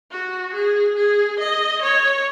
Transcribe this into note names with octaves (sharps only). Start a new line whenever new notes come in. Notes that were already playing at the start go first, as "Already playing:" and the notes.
F#4
G#4
G#4
D#5
C#5